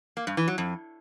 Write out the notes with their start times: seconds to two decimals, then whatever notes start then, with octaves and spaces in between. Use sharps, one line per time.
0.17 A#3
0.27 G2
0.37 E3
0.48 F#3
0.58 F2